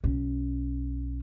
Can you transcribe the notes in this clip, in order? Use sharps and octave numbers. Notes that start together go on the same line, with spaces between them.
B1 C#4